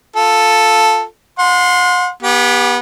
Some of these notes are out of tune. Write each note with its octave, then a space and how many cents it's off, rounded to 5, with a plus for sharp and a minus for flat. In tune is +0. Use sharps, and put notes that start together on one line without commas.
F4 +5 A4 +0
F#5 -45 C6 +0
B3 -30 G4 +10